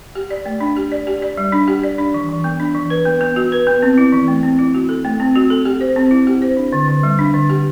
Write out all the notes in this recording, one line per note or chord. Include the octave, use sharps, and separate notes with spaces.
G4
D5
A3
D4
G4
D5
G4
D5
G3
D4
G4
D5
D4
E3
E3
B3
D4
E3
B4
B3
B3
F#4
B4
B3
C4
E4
E3
A3
C4
E4
F#4
A4
A3
C4
F#4
A4
G4
C5
C4
E4
G4
C5
D4
D3
D3
G3
D4
D3
G4